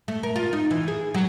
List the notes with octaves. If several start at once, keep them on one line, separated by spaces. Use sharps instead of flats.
A3
A#4
F4
D#4
E3
G#4
F#3